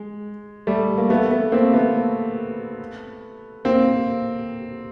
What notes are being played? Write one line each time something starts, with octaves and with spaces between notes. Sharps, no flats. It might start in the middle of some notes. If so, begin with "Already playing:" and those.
Already playing: G#3
G3 A3
A#3
A3 B3
A3 B3
A#3 C4
A3 B3
A#3 C4